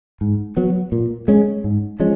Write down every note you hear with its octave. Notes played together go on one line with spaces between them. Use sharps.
G#2
F#3 B3
A#2
G#3 C#4
G#2
F3 G#3 C#4